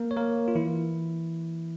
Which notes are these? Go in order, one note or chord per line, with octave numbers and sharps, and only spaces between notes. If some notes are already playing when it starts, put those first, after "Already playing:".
Already playing: A#3 A#4
C#5
A#3 A#4
F4
E3 E4